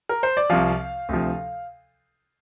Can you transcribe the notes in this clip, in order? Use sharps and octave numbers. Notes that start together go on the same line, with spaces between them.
A#4
C5
D5
C2 C3 F3 F5
D2 C3 F3